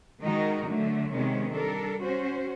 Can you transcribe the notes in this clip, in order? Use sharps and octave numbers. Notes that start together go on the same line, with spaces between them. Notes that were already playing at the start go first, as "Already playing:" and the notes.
D#3 G#3 D#4 F#4 A#4 D#5
D3 F#3 A3
C3 D#3 G#3 B3 C#4
G3 D4 A4 A#4
C#4 F#4 C5